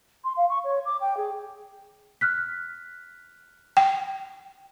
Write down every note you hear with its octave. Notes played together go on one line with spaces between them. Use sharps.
C6
F5
C#6
C#5
D6
G5
G#4
F6 F#6 B6
G5